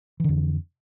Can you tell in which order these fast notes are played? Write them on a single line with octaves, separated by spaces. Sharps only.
E3 D3 F2